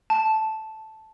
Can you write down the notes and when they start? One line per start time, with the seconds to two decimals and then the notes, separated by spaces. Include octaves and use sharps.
0.10 A5